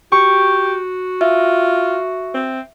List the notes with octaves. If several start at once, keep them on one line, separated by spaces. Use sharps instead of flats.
F#4 G4 C#6
F4 E5
C4